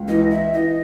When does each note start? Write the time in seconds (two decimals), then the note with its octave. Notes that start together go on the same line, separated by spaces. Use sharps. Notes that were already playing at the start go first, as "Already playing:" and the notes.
Already playing: C#2
0.08 E3 D#5
0.30 E3 E5
0.53 E3 D#5